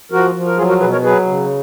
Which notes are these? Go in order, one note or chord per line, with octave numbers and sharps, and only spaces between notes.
F3 F#4 A#4
F3
A#4
F#3 F4 G#4
F#4 A#4
B2 G#4 B4
A#4 C#5
F#3 G#4 B4
C#3